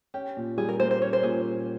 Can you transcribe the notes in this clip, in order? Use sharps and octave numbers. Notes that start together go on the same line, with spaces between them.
C#4 G4
A#2
G3 G#4
A#4
A#3 C5
C5
C#4 C#5
C5
A#2 G#4